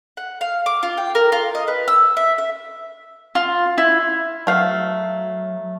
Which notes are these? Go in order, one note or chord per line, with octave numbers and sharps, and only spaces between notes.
F#5
F5
D6
F4
G5
A#4
F4
D#5
B4
E6
E5
E5
F4
E4
F#3 A3 F5